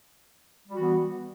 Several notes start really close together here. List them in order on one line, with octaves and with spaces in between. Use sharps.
G3 F#4 E3 B3